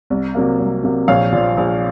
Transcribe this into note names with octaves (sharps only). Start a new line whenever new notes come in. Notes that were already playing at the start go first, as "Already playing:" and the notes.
C2
C3 F#3 A#3
C2
C3 F#3 A#3
A#1 C#5 F5
A#2 F3
A#1